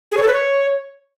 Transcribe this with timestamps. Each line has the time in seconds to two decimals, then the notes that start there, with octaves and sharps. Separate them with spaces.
0.12 G#4
0.17 C#5
0.22 A4
0.28 B4
0.33 C#5